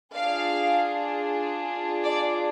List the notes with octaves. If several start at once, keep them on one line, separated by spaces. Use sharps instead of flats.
D4 F4 G#4 D5 F5
D5